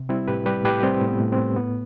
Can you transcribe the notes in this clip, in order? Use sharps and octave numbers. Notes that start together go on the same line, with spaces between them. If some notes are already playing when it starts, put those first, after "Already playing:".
Already playing: C3
G3 C4 E4
A2 G4 B4
G3 G4 B4
A2 G4 B4
G3 C4
A2
B3
A2
C4
A2
A2 B3